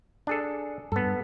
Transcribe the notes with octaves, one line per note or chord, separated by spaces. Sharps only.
D4 G#4 A4
G2 B3 A4